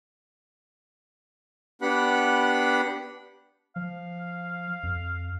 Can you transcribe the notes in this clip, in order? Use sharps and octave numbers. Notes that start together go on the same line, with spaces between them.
B3 D4 G4 F#5 B5 F#6
F3 F5
F2